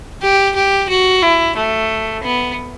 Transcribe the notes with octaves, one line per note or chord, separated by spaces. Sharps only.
G4
G4
F#4
E4
A3
B3